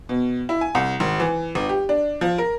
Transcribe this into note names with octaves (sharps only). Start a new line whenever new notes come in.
B2
E4
G#5
C2
G#1
E3
G1
G4
D4
F3
A#4